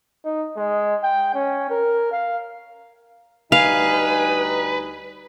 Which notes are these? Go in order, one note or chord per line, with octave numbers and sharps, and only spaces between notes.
D#4
G#3
G5
C#4
A#4
F5
D2 G3 D#4 B4 F5 G#5